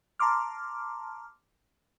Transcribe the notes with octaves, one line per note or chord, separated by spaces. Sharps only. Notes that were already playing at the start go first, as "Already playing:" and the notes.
A5 A#5 C6 D6 F6